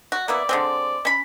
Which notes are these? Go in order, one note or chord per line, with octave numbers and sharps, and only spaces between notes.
F#4
A#3 B3 E4 D5
D3 G#3 C4
C#4 B5